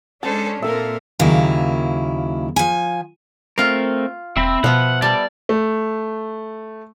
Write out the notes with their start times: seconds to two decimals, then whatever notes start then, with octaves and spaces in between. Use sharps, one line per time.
0.23 G#3 C#4 D4 A4 C5 A5
0.62 A#2 A#3 C4 A4 A#4 E5
1.19 D#2 C#3 F#3 A#3 E4
2.56 F3 G#5
3.58 A3 C4 F4 A#4 F5
4.37 E1 C4 E5 B5
4.64 B2 F3 B3 F#5
5.02 G3 D5 A5
5.49 A3